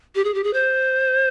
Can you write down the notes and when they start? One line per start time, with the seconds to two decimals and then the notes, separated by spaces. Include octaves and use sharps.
0.15 G4
0.24 G#4
0.34 G4
0.44 G#4
0.53 C5